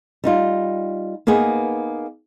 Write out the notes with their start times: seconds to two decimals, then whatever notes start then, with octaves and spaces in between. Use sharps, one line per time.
0.24 G3 D#4 F4
1.27 A#3 B3 D#4 G#4